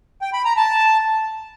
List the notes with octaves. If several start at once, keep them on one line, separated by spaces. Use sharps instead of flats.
G5
B5
A#5
A5